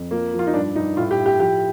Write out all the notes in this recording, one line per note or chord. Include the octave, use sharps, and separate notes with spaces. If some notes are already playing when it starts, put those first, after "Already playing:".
Already playing: F2
F3 A#3
F3
F4
D#4
G2 D4
G2 D#4
A2 F4
G4
A2
G4
F3 G4